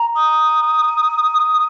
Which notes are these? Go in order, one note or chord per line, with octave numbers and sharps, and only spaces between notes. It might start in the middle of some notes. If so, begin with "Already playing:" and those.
Already playing: A#5
D#6